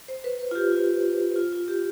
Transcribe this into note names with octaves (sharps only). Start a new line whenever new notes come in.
C5
B4
B4
F4
G4
F4
F4
F4
G4